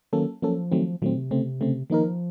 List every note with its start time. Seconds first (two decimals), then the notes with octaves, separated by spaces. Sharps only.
0.12 D#3 F#3 A#3 C#4 A4
0.42 F3 F#3 A#3 C#4 A4
0.71 D#3 F#3 A3 C4
1.02 A#2 D#3 F#3 A3 C4
1.16 C3
1.31 C#3 A3 C4
1.61 C#3 A3 C4
1.90 D#3 F3 A#3 D#4 A#4